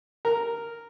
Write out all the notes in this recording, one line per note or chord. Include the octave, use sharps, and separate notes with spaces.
A#4